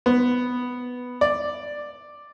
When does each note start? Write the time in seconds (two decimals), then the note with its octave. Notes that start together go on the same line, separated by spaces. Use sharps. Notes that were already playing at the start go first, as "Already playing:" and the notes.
0.06 B3
1.21 D5